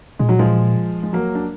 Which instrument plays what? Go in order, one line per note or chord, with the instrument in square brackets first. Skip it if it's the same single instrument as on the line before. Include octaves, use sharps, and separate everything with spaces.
[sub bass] A#2 [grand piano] G#3
[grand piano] F#3
F3 G#3
G#3
F#3 A#3
D4